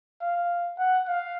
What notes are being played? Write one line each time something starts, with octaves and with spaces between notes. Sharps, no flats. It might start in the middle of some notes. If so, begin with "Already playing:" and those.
F5
F#5
F5